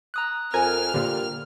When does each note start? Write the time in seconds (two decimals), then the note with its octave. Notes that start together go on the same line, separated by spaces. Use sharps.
0.14 A#5 D#6 F#6
0.54 F2 A#4 G#5 F6
0.94 A#2 D3 G3